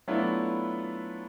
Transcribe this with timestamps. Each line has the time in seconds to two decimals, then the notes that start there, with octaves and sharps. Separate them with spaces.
0.08 F#3 A3 B3 D4 E4 F4